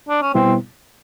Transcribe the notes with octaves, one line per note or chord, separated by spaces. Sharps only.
D4
C#4
B2 G3 B3 C4 E4